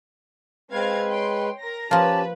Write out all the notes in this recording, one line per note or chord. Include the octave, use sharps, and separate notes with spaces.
G#3 C4 B4 F5 G#6
C#5 G5 C6
A#4 A#5 A#6
F3 A#3 C#4 G4 B4 A5